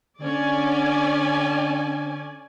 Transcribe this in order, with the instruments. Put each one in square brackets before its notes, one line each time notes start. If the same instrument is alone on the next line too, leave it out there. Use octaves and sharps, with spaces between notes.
[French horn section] D3 [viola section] C#4 D5 G#5